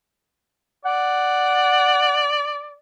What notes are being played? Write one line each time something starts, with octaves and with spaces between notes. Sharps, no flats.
D5 F#5